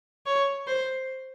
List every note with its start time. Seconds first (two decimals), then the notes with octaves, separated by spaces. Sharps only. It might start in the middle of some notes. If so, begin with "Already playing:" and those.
0.26 C#5
0.67 C5